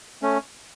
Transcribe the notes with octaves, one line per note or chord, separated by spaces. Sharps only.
A3 C#4